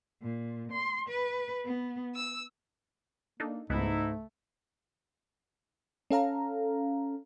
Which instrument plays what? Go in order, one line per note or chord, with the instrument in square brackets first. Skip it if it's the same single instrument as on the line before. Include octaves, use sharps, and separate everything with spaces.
[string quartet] A#2
C6
B4
B3
E6
[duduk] A#3 [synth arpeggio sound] D4 D#4 A4
[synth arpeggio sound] C#2 G#3 B3 [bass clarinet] G#2 [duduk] A3 [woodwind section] D#4 E4
[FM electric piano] C#4 A4 F5 A#5